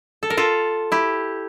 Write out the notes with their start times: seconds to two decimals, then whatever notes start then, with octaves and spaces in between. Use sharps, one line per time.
0.23 A4
0.30 A#4
0.37 F4 A4
0.92 E4 G4